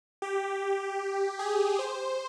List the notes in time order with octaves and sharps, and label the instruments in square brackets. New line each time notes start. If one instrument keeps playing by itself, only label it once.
[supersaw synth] G4
G#4
C5